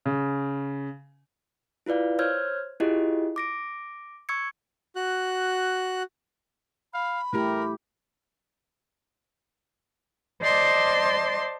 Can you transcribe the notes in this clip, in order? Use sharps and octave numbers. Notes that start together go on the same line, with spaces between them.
C#3
E4 F4 B4 D5 F5
C5 C#5 E6 F6 G6 G#6
E4 F4 G4 G#4 D#5
D6 A#6 D7
C#6 E6 G#6 C#7
F#4 F#6
F5 B5
A3 E4 G4 A#4
C5 D5 D#5 A5 C6 D6